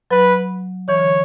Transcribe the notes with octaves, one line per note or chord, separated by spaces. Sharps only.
F#3 B4
E3 C#5
D3